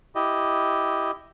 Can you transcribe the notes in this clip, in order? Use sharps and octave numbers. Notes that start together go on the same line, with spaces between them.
E4 G4 D#5